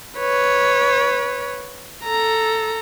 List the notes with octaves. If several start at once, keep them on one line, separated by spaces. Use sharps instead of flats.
B4 C#5
A4 A#5